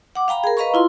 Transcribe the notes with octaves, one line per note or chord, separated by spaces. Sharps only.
F#5 D6
F5 G5 A#5 B5
G#4 A#4
B4 D#5 F5 A#5 B5 C#6
E4 F4 C6